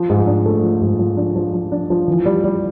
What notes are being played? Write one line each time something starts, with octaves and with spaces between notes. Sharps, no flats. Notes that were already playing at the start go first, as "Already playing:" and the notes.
Already playing: F3
G#2
D4
A3
F3
G#2
F3
D4
F3
F3
D4
F3
E3
G3
G3